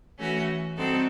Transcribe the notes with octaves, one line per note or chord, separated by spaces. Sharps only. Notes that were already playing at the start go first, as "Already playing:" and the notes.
E3 A3 C#4 F#4
G3 C4 D#4 F#4 A4